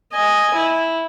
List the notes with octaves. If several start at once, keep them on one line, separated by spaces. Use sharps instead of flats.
D#5 G#5
E4